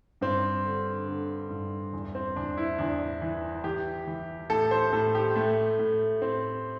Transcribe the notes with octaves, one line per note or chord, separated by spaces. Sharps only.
G2 C4
D3
D3
G2
E2
C4
E2 D4
E4
E2 D4
E3
E3 G4
E3
A2 A4
C5
A2 A4
G4
A2 A3
A2
A2 C4